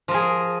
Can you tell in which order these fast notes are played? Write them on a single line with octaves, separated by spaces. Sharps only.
F3 A#4 G#4